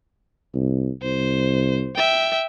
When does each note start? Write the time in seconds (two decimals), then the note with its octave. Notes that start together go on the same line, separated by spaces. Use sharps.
0.54 C2
1.03 C2 C5
1.96 E5 G5